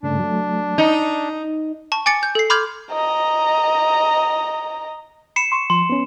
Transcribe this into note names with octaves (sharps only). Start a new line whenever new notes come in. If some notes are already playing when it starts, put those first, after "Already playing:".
G2 C#3 A3 D4
F#3 A3
D#4 D#5
A5 C#6
G#5 D6 A6 C#7
G6
A4 C7
B5 C6 D6 F6 G6 G#6
D#5 A#5
B5 C7 C#7 E7
C6 C#6
F3 C6
B3 C#4